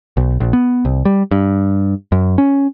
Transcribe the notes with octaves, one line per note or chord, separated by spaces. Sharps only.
B1
A#1
B3
C2
G3
G2
F#2
C#4